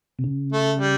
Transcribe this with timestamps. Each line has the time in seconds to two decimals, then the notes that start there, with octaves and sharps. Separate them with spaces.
0.19 C3
0.24 C#3
0.52 A3
0.79 G3